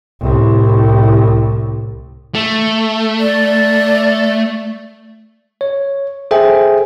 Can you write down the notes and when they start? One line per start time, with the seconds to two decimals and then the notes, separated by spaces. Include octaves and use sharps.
0.21 C2 A2
2.35 A3
3.20 D5
5.61 C#5
6.31 G#4 A4 C5 E5 G5 G#5